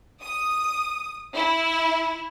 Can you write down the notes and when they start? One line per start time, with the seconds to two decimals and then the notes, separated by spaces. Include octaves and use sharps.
0.22 D#6
1.34 E4